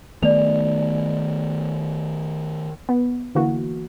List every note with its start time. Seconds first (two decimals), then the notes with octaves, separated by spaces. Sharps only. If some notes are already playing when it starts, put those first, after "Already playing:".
0.23 D#3 A3 B3 D5 F7
2.89 B3
3.35 D3 E3 A#3 F#4